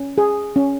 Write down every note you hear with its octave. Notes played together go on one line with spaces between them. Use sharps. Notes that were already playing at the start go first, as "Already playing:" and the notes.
Already playing: C#4
G#4
C#4